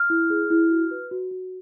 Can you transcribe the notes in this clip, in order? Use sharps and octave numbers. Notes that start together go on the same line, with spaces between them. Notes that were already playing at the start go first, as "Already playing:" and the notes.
Already playing: F6
E4
G#4
E4
F#4
B4
F#4
F#4